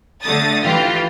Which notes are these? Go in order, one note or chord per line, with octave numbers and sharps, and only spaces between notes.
D3 A3 D#6 A6
E3 F4 G4